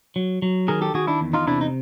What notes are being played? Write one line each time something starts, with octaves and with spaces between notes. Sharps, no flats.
F#3
F#3
D#3 G#4 A#4
G4 A4
D#3 F#4 G#4
D4 E4
E2
D#4 F4
C3 D4 E4
D#4